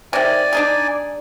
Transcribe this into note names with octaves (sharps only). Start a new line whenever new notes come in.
C3 D#3 D5 G#5
D4 D#4 G#4